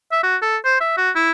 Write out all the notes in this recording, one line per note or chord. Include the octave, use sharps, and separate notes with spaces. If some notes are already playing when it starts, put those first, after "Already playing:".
E5
F#4
A4
C5
E5
F#4
E4